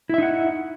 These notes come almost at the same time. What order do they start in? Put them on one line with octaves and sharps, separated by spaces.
E4 E5 D#4 F#5